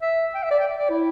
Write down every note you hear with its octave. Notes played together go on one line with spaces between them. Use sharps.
E5
G5
E5
D5
G5
D5
E4